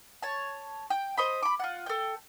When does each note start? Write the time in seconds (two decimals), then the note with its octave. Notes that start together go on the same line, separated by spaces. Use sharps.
0.22 C#5 A5
0.90 G5
1.17 C5 D#5 B5
1.43 B5 D6
1.60 F4 F#5
1.86 A4 G5